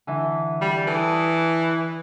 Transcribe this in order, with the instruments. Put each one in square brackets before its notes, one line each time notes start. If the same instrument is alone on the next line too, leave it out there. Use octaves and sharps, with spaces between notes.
[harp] D3 E3
[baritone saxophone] G3
[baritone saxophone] E3 [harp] A4 D#6